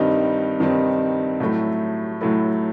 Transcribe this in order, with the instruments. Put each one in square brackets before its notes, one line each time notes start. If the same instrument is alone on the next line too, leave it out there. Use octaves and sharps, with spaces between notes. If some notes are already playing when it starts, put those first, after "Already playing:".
Already playing: [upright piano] G2 D#3 G3 C4 D#4
G2 D#3 G3 C4 D#4
A2 F#3 A3 E4
A2 F#3 A3 E4